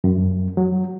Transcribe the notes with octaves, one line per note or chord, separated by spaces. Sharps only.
F#2
F#3